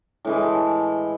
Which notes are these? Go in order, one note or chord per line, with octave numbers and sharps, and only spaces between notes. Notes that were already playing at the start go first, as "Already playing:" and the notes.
A2 E3 G#3